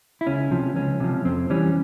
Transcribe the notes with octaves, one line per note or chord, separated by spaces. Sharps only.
E4
C#2 C#4
C3 F3
C#2 C#4
C3 F3
F2 C4
E3 G3 C#4